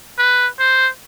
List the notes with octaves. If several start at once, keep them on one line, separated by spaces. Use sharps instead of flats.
B4
C5